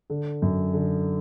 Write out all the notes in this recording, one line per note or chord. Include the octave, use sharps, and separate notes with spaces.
D3
F#2
D3